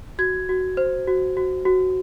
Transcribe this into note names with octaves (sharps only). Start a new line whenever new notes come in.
F#4 G#6
F#4
C5
F#4
F#4
F#4